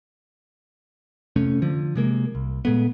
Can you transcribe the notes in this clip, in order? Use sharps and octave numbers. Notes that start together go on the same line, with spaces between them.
F2 C3 A3 C#4
D3 F3
C3 G#3 A#3
C2
A#2 G#3 A3 B3